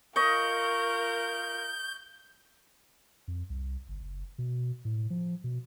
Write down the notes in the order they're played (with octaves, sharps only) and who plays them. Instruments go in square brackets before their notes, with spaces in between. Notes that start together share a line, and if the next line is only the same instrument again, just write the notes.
[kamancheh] F4 A#4 [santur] D#5 C#6 [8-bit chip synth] G6
[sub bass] F2
C2
G1
F#1
B2
A2
F3
B2